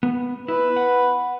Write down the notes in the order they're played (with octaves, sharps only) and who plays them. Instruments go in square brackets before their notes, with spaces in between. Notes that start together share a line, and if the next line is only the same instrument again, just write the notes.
[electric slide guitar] B3
[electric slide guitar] E4 [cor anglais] B4
[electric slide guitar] F#5